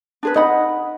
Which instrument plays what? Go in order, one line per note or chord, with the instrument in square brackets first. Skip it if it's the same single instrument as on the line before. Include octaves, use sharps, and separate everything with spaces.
[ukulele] D4 G#4 B4
[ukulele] D#4 F#5 B5 [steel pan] D#5